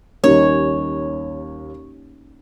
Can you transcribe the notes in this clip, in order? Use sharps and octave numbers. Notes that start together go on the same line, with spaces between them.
D#2 G3 A#3 C#4 D#4 A#4 C#5